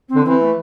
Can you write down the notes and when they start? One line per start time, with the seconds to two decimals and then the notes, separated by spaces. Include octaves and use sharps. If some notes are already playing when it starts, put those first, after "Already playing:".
0.08 C4
0.15 D3
0.24 E3 C4
0.40 A3